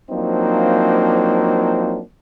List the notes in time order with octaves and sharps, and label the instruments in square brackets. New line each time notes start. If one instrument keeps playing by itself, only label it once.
[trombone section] F3 F#3 A#3 C4 D4 D#4